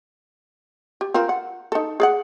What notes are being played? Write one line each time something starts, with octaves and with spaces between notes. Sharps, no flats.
G4
C4 F4 A#4
F#5
D#4 A4
G#4 D5 F#5